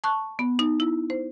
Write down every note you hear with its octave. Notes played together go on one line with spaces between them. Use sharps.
A5 C#6 F#6
B3
D#4
E4
C5